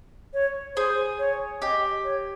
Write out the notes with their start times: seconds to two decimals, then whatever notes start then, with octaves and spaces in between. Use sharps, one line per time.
0.34 C#5
0.76 G#4 C5
1.19 C#5
1.62 G4 D#5
2.04 C#5